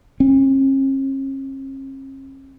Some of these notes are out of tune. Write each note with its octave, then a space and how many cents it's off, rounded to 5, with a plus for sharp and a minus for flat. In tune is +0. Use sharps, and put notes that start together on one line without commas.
C#4 -45